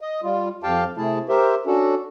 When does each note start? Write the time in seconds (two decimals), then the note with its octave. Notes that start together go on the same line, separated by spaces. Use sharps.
0.01 D#5
0.23 G3 F4
0.63 F2 G4 F5 G5 A5
0.97 C3 A3 E4 G#4 A5
1.29 G4 A#4 C5 E5
1.66 C#4 D4 F#4 A4